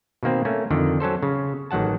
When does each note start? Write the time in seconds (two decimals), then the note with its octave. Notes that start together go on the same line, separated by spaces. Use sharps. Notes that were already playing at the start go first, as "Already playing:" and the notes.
0.23 B2 D#3 A#3 C4
0.45 A3 A#3 C#4
0.70 F2 D3 D#3
1.00 F#3 C#4 A4 C5
1.23 C#3
1.71 A1 D#3 F#3 F#5 A5